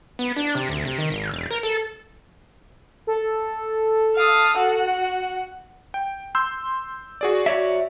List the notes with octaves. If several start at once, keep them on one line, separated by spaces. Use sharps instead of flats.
B3
D4
C3
D2
C3
D#3
G#1
E1
A#4
A4
A4
F5 D#6
F#4 F#5
G5
C6 E6 G6
F#4 G#4 D5
F#4 C#5 D5 E5